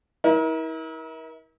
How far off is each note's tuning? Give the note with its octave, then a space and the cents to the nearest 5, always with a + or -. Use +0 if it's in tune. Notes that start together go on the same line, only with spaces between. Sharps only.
E4 -40 A#4 +35